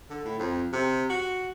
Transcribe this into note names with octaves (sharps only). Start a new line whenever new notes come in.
D3
A2
F2
C3
F#4